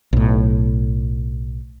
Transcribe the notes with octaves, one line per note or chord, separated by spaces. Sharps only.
B1 A2